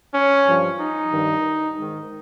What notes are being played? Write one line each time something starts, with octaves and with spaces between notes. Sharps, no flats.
C#4
G2 F3
D#4
G2 D#3
G#2 D#3